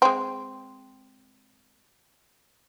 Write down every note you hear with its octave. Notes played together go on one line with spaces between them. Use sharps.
G#3 C4